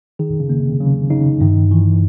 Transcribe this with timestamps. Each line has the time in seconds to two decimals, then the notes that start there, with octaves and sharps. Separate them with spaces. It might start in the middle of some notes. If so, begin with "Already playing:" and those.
0.19 D#3 G#4
0.40 C#3
0.50 A#3
0.60 C3
0.80 C#3 F#3
1.10 C#3 D#4
1.41 G2 D#3
1.71 D#3 E3